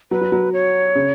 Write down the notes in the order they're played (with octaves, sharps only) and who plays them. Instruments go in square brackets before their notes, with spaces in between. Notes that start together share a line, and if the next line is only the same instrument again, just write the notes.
[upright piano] F#3 [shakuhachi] B4
[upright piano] F#3
F#3
[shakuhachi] C#5
[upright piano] C#3